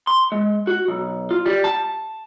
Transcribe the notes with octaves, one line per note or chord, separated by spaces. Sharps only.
C6
G#3
F#4
B1
F4
G3
A5